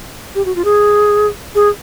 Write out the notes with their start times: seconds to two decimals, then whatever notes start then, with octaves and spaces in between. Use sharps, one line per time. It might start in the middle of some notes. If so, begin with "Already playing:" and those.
0.35 G4
0.45 F#4
0.56 F4
0.65 G#4
1.55 G#4